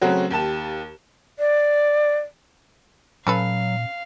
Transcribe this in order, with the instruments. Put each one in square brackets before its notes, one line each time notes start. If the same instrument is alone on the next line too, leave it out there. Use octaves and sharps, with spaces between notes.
[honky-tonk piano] C#3 F#3 A3 C4 C#4 F#4
D#2 G4 A5 E7
[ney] D5
[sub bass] A#2 [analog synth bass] F#3 [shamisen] C#4 A4 B4 [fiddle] F5